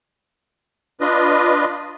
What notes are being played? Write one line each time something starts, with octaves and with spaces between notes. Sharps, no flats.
D4 F4 B4 D#5